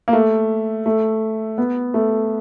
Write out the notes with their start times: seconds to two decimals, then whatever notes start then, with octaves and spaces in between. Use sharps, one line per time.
0.08 A#3
0.13 A3
0.86 A3
1.58 B3
1.94 A3